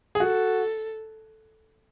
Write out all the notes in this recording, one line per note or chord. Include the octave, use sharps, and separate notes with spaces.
G#4
F#4 A4